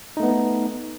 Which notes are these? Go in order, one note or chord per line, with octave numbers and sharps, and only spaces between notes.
A3 B3 D#4